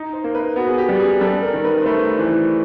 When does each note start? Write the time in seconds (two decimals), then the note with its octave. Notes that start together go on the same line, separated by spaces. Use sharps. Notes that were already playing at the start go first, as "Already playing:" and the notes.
Already playing: D#4
0.13 C5
0.24 A#3
0.35 B4
0.56 B3 F#4
0.68 G#4
0.78 G4
0.89 G3
1.00 G#4
1.21 G3 A4
1.42 A#4
1.53 D#3
1.65 B4
1.82 C5
1.86 A3 B4
2.18 E3 C5